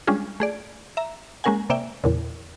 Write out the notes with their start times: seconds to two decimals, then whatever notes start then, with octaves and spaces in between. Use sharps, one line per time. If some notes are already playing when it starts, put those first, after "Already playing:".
0.07 G3 G#3 C#4 D4 F4 G#4
0.40 A3 G#4 D5
0.97 E5 A#5
1.44 G#3 A#3 C#4 A#4 F#5 G#5
1.70 C3 A#3 D5 E5 G5
2.04 E2 A#2 C#3